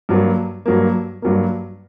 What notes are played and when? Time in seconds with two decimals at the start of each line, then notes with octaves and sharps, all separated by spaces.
0.09 G2 F#3 A#3
0.66 G2 F#3 A#3
1.22 G2 F#3 A#3